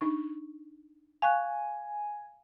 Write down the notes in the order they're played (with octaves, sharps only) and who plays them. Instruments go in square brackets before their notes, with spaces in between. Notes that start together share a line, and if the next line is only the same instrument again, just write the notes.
[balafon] D4 D#4 C#6
[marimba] F5 C#6 F#6 [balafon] G5 [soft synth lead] G#5